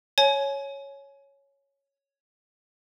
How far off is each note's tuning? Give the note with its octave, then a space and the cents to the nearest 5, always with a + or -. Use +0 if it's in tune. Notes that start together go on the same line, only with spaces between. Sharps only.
C#5 +0 G#5 +30